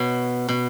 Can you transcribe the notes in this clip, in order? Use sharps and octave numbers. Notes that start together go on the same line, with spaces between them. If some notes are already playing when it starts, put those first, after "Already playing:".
Already playing: B2 C#5
B2